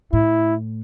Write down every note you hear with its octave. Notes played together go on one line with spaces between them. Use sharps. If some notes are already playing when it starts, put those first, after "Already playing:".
A2 E4